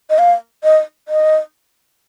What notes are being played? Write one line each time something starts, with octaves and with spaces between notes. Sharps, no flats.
D#5
F5
D#5
D#5